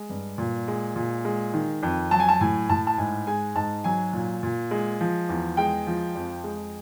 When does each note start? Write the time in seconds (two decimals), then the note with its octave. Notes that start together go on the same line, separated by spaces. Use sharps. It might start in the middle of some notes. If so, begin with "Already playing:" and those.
Already playing: G#3
0.09 G2
0.38 A#2
0.68 G#3
0.96 A#2
1.25 G#3
1.54 D#3
1.83 F2
2.11 F#3 A5
2.20 G#5
2.29 A5
2.41 A2 G#5
2.69 A2 A5
2.87 A5
2.98 G#2 G#5
3.27 G#3 G#5
3.55 G#2 A5
3.84 F#3 G#5
4.13 A#2
4.43 A#2
4.71 G#3
5.00 F3
5.29 E2
5.57 G#3 G5
5.87 F3
6.15 F2
6.44 G#3